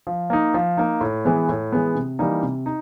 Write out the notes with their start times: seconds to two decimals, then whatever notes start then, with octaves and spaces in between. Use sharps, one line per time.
0.07 F3
0.30 A#3 D#4
0.54 F3
0.77 A#3 D#4
1.01 A2
1.25 E3 G#3 B3
1.49 A2
1.72 E3 G#3 B3
1.95 C3
2.19 E3 G3 A#3 D#4
2.43 C3
2.66 D#4